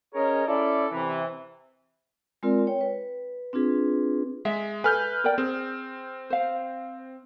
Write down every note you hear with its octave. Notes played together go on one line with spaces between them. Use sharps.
C#4 G#4 A#4 C#5 D#5
C#4 E4 A4 D5
C3 E3
G#3 C4 F4 A#4 D5
C#5 G5
B4
C4 D4 F4 G#4 B4
G#3 E5
A4 B4 G#5 F6 G6
A#4 D5 G5
C4 G#4
C5 F5